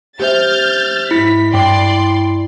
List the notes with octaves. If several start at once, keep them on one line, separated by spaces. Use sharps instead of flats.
G4 C5 E5 F6 G6 A6
G#2 E4 B6
G2 D5 G5 C6 D6